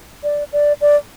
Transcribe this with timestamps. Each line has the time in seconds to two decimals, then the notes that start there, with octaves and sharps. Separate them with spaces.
0.23 D5
0.53 D5
0.81 D5